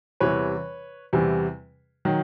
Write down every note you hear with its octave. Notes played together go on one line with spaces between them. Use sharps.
E2 C3 E3 G3 B4 C#5
E2 C3 E3 G3
D#3 F#3